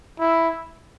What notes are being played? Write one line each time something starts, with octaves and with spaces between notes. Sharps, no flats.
E4